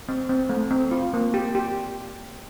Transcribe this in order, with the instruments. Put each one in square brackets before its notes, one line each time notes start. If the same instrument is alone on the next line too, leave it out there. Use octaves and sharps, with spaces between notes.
[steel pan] C4
C4
A3
C4
F4
A#3
G4
G4